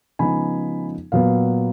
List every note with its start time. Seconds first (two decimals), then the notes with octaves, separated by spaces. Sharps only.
0.19 C#3 F3 G#3 B3 D#4 G#5 B5
1.12 A#2 F#3 B3 F5